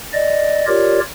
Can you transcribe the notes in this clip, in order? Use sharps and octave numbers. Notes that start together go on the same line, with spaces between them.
D5 D#5
F4 G4 A#4 C#5 D5